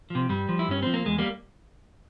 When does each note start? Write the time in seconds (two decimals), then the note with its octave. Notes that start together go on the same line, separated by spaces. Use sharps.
0.10 C3 F3
0.29 G2 G3
0.49 F3
0.59 E4
0.68 G2 C#4
0.83 F3 C4
0.94 A#3
1.06 E2 G#3
1.18 G3 A#3